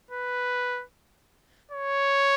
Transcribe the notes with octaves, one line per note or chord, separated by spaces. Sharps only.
B4
C#5